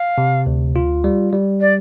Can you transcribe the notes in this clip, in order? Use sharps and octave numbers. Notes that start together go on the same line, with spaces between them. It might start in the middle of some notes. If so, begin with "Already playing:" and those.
Already playing: F5
C3
D2
F4
G3
G3
D5